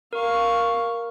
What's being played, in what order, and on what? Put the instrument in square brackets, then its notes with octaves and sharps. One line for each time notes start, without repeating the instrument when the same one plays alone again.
[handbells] A#4 [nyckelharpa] F5 C#6